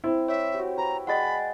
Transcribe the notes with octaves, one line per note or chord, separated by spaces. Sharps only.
C4 E4
C#5 E5
F#4 G4
B4 A#5
G#3 D5 F#5 G5 B5 A6